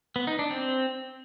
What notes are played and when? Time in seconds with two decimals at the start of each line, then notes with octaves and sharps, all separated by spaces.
0.16 B3
0.27 D#4
0.39 D4
0.51 C4